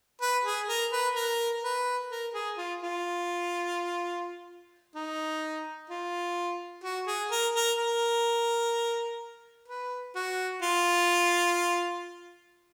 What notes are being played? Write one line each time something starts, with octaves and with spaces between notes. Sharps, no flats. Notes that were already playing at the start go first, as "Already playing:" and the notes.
B4
G#4
A#4
B4
A#4
B4
A#4
G#4
F4
F4
D#4
F4
F#4
G#4
A#4
A#4
A#4
B4
F#4
F4